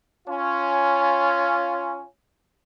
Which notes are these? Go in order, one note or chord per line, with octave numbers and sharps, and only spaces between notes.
C#4 F4